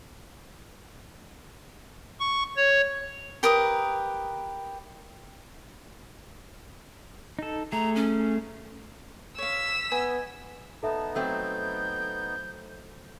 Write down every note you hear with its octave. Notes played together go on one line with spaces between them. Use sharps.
C#6
C#5
G4 A#4 B4 D#6
D#4 A4
A3 G#4 A#5
C#4
C#5 F5 E6 B6
B3 D#5 G#5
B3 D#4 A4 E5 A5
F#3 A3 C4 G6